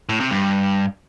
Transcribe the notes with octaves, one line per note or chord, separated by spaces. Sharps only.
A2
C3
G2